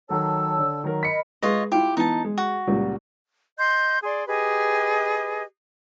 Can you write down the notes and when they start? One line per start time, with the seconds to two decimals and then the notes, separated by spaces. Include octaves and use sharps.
0.09 D#3 F#3 A4 C#5 A5 E6
0.58 D3
0.84 D#3 F#3 A#4
1.03 A#4 D#5 B5 B6 C#7
1.43 G#3 F4 G#4 B4 C#5 D#5
1.72 E4 F4 G4
1.97 E3 B3 D#4 A5
2.24 G#3
2.38 F#4
2.67 C#2 A#2 G3
3.58 D#5 C6 G6
4.03 G#4 D5 C6
4.27 G4 G#4 B4 D#5